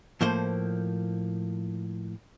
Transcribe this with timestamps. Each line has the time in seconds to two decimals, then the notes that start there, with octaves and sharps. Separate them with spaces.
0.21 A2 F3 A#3 C5